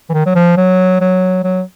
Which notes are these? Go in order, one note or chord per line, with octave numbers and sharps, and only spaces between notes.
E3
D#3
F#3
F3
F#3
F#3
F#3